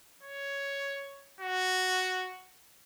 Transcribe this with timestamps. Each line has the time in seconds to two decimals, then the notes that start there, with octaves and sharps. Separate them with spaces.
0.23 C#5
1.40 F#4